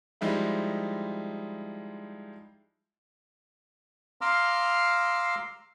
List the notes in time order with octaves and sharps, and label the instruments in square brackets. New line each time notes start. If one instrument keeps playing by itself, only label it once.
[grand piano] F3 G3 G#3 D#4 E4
[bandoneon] F5 A#5 C6 D6 E6 F6